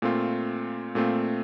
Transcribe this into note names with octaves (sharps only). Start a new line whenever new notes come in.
A#2 A3 C4 F4
A#2 A3 C4 F4